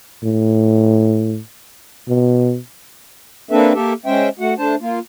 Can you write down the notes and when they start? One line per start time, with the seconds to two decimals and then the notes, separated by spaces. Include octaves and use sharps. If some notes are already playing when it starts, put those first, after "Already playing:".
0.24 A2
2.09 B2
3.51 A#3 C4 D4 A4 B4 E5
3.74 A#3 G4 A4 E5
4.06 G#3 C#4 C5 E5 G5
4.40 A3 F#4 F#5
4.58 A3 D4 C5 A5
4.81 A#3 F4